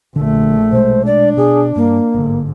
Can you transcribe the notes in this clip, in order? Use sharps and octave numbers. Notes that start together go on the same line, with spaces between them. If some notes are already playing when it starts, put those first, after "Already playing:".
A#1 D3 A3
B2 G#3 C5
D4 D5
B2 G#4
G2 A#3
G1 G#2 D3